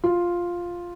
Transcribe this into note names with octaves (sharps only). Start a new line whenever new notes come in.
F4